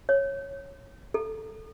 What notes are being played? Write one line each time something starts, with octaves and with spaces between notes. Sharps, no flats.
C#5
A4